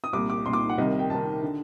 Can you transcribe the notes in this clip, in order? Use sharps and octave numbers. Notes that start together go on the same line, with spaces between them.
D#6
C2 A#2 D6
D6
C2 A#2 C6
D6
F#5
C2 C3 D#3 D#5
G5
C2 C3 D#3 A5
D3